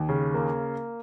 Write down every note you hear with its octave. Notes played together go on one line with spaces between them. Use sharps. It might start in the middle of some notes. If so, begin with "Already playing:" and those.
Already playing: D#2
C#3
A#3